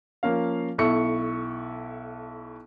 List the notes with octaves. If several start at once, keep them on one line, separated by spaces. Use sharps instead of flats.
F3 A#3 C#4 F5
B1 E4 A4 C#6 C#7